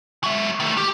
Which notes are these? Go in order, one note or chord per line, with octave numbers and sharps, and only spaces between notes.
F#3 E5
D#3 A3
G4